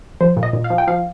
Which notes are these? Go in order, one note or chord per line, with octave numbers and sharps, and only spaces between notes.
F3 C5
A#2
D#5
A#2
F5
F3
G5
F3 F5